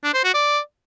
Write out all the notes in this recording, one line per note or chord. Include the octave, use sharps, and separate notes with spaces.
D4
C5
F#4
D5